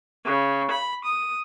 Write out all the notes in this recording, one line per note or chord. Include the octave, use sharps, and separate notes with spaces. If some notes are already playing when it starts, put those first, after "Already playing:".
C#3
B5
D#6